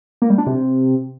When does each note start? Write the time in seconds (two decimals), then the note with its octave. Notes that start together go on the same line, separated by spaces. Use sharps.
0.22 A#3
0.30 G3
0.38 D4
0.47 C3